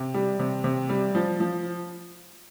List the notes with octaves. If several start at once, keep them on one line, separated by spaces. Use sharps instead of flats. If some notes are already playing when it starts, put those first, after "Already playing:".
Already playing: C3
G3
C3
C3
G3
F3
F3